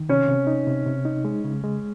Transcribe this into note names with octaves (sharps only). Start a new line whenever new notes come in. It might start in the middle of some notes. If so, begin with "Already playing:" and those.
Already playing: D#3
C3 C#4
C3
D#4
C3
C3
D#4
G#3
C#3
G#3